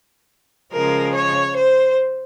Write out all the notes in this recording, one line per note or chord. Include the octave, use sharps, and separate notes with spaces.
C#3 F3 G#3 A#4
C#5
C5